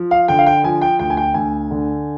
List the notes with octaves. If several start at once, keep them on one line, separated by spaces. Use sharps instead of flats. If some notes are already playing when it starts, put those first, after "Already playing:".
Already playing: F3
F5
D3 G5
F5
G5
F3 G#5
G5
D2 G5
G#5
G5
D2 G#5
D3